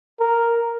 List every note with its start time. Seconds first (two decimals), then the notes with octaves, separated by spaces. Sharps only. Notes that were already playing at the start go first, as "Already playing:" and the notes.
0.20 A#4